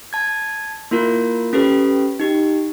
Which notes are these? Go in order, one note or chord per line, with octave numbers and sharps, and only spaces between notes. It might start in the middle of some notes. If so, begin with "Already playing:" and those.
A5 G#6
A#3 E4 F4 A#4
C#4 G4 A4 B4
D#4 G4